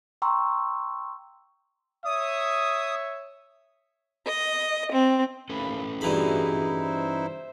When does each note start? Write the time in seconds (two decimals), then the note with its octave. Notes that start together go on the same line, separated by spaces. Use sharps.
0.22 G5 A#5 C6 C#6 E6
2.05 C#5 E5 D#6
4.27 D#5
4.91 C4
5.50 D#2 C#4 A4 B4 B5
6.01 G2 E3 D#4 E4 F#4 G#4 B5
6.82 C5 E5